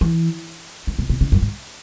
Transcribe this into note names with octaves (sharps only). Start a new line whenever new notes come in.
E3
D#3
B2
B2
C#3
F#2
G#2